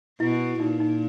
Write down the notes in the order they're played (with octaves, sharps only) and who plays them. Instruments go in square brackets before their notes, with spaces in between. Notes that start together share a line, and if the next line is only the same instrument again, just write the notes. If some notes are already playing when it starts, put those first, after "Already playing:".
[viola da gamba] B2 [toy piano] E4
[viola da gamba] A#2 [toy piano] D#4
[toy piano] D#4